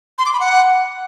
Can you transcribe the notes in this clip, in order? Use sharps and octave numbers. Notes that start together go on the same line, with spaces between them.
C6
D6
B5
F#5